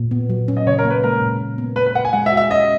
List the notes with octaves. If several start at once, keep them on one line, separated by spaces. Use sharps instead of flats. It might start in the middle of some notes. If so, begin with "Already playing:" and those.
Already playing: A#2
B3
F#3
C#4
D#5
C#3 C#5
A#4
A#3
B4
G#3 A#4
A#2
A#2
B3
B3 B4
B4
A#4 F#5
G#5
G#3 F#5
E5
F#4
E5
C#4 D#5